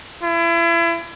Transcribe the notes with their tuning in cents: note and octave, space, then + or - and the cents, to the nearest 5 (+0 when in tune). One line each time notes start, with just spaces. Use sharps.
E4 +35